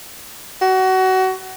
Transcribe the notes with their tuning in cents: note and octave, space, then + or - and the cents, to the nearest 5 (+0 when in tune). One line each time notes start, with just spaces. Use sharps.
F#4 +25